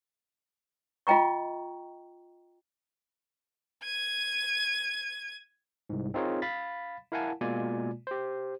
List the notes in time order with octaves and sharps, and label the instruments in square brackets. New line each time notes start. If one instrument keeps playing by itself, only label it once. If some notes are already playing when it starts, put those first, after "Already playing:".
[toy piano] F4 D#5 G5 A#5 C#6
[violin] G#6 D#7
[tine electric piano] C2 G#2
C4 D#4 F4 G#4 A#4 C#5
F5 B5 A6 B6
E4 A#4 F5 F#5 G#5 A5
B2 G#3 A#3 F4 D5 G#5
G4 C5